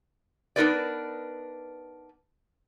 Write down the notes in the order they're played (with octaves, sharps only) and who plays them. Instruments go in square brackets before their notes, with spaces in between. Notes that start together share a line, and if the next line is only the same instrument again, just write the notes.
[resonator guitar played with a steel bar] B3 D4 D#4 A#4 B4 D5